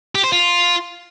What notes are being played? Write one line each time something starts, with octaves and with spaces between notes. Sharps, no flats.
G4
C5
F4